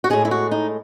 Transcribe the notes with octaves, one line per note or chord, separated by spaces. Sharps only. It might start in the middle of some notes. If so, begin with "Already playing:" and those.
F#4
A2 G#3 G#4
E4
F#4
D#4